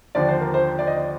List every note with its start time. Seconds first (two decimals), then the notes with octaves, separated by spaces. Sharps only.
0.15 D#2 D3 F3 D5
0.28 C5
0.41 A#4
0.54 C5
0.79 D5
0.87 D#5
0.97 D5